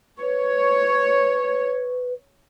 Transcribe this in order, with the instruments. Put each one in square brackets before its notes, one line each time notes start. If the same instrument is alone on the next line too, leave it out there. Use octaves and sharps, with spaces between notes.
[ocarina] B4 [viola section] C#5